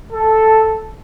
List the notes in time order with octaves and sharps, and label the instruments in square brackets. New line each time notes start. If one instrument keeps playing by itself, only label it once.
[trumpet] A4